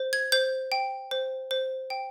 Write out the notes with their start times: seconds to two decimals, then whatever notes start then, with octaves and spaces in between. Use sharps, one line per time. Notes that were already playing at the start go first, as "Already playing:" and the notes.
Already playing: C5
0.13 G#6
0.32 C5 G6
0.72 G5
1.11 C5
1.51 C5
1.90 G5